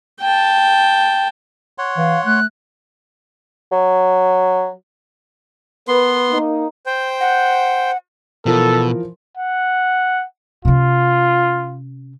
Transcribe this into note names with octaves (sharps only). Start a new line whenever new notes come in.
G5 A5
C#5 F#5 C6
E3 F5
A3 F#6
F#3
B3 A#4 B4 C6
A#3 D#4
C5 G5
F#5
B2 E3 F3 A4 A#4
F#5
C3 C#4 F4